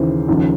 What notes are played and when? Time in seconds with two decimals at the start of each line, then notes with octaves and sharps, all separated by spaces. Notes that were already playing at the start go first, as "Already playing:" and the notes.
Already playing: D#2 C#3 E3 C5
0.28 D#2 C#3 F3